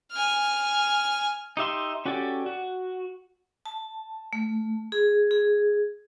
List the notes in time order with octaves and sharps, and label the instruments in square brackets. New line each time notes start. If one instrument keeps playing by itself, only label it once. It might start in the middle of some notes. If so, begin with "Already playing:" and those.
[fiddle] G#5 F6
[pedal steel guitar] D#4 G4 E5 C6
C#4 F#4 G4 A4 D5
F#4
[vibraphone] A5
A3
G#4
G#4